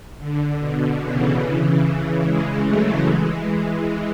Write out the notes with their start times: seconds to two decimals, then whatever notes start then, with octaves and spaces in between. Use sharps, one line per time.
0.19 D3
0.59 B2
1.01 C#3 E3
2.24 E3 G#3
2.65 F#3 A3
3.06 E3 G#3